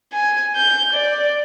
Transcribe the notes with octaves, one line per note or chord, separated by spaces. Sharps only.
G#5
G6
D5